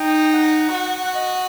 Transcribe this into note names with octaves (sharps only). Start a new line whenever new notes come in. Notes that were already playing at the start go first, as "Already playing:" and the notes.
Already playing: D#4 G5
F#5
F#4
F#5
D#5